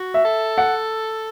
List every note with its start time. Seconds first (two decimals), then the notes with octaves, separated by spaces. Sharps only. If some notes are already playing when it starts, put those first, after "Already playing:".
Already playing: F#4
0.14 E5
0.25 A4
0.58 F#5